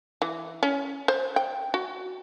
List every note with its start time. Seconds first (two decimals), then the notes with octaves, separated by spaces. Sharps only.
0.22 E3
0.63 C#4
1.08 C5
1.36 G5
1.74 F#4